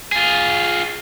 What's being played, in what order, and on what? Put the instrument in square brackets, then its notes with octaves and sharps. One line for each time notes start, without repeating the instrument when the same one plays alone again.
[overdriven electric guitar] F4 G#4